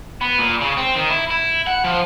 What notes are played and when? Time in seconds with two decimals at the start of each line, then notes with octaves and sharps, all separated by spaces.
0.21 B3
0.38 A#2
0.61 C#3
0.77 C4
0.96 D#3
1.10 E4
1.30 E4
1.67 F#5
1.84 F3